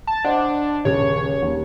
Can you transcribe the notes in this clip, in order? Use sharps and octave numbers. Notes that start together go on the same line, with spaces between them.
A5
D4 C5 D#5 F#5
D#1 C#3 C#5 G#6
D#2